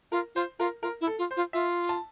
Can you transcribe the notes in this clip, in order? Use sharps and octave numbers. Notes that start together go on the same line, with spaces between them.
F4 A#4
F4 C5
F4 A#4
F4 A#4
E4
A4
F4
C5
F4
F4 E5
A5